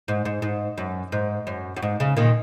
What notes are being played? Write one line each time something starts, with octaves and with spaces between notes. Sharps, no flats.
G#2
G#2
G#2
F#2
G#2
F#2
F#2
G#2
C#3
A#2 D#3